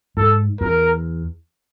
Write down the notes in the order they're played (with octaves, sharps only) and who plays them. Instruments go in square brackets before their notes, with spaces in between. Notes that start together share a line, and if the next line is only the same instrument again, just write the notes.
[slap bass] G#2 [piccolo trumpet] A4
[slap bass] E2 [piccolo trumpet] A#4